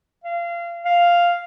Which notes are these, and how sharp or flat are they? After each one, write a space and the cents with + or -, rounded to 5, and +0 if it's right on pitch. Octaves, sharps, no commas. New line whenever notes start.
F5 -25
F5 +0